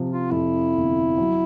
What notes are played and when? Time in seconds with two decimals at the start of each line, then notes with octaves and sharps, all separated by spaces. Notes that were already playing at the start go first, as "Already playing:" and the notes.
Already playing: C3 F3
0.10 F4
0.31 F2 E4
0.75 G1
1.18 F#3